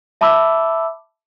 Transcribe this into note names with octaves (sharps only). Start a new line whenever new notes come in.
E5 A5 B5 D6 E6